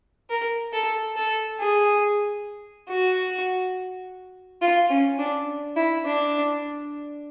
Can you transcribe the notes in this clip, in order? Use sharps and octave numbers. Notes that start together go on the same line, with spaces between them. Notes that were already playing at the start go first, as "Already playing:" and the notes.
A#4
A4
A4
G#4
F#4
F4
C#4
D4
E4
D4